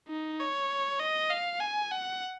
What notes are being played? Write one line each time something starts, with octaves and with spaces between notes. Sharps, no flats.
D#4
C#5
D#5
F5
G#5
F#5